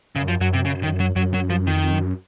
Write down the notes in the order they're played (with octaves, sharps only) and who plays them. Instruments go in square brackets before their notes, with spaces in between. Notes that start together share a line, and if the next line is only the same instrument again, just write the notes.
[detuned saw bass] F#2 [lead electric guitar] C#3
[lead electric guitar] F3
[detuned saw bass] F#2 [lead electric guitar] F#3
[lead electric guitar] C3
C#3
D#3
F#3
[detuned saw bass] F#2 [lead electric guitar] F#3
[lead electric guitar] F#3
F3
[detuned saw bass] F2 [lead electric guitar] D#3
[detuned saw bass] F#2